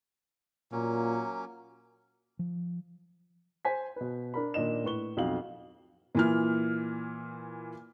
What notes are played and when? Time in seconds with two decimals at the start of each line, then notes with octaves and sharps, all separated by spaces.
0.72 A#2 F#3 A#3 C#4
2.39 F3
3.65 C5 G#5 B6
3.96 B2 B4
4.34 D4 A#4 B5
4.54 A#2 D#3 D4 D#5 E7
4.84 A2 B4 C#6 G7
5.17 B1 F2 F#4 F5 F#7
6.15 A#2 E3 F6